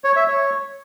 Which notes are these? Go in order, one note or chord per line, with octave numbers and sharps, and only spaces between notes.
C#5
E5
C#5